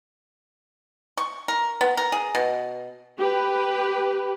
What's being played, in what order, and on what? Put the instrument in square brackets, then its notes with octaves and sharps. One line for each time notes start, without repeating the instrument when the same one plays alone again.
[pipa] C#6
A#4
B3
A#4
G#4
B2
[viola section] G4 B4